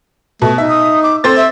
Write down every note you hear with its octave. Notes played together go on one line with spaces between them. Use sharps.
B2 A3
D#4 E5
D#6
D6
C4 A4 C5 A6
E5